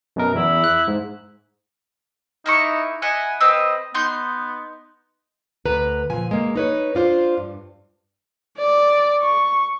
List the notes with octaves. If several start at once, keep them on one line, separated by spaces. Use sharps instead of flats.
F#2 B2 A#4
E2 E4
F#6
G#2
A#3 D#4 E4 C#6
E4 D#5 F#5 G#5
C4 B4 D#5 E6
B3 D#4 C6 G6
D2 B4 A#5
A#2 F3 G#5
G#3 A#3
D#4 B4 C#5
D4 F4 C5
G2
D5
C#6